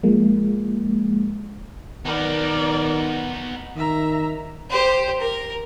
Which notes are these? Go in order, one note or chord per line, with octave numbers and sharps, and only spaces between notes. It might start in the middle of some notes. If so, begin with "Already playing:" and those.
F3 G#3 A#3
D#3 B3 D#4 A#4 D5
D#3 E5 A#5
G4 C5
A#4